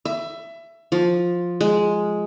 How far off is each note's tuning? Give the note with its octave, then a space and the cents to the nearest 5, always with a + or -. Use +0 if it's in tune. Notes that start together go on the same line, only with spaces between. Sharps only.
E5 +20
F3 +10
G#3 +5